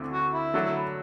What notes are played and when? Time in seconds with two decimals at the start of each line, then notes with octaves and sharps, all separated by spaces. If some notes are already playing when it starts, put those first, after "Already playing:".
Already playing: D2 D3 A3 C4 E4
0.13 F#4
0.33 E4
0.54 D3 F#3 A3